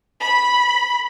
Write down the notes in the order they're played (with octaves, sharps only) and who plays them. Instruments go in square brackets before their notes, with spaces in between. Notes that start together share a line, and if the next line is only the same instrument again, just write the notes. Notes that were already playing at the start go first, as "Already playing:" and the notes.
[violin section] B5